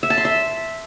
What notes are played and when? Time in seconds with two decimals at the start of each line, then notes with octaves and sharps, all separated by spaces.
0.03 E5
0.10 A5
0.18 C6
0.25 E5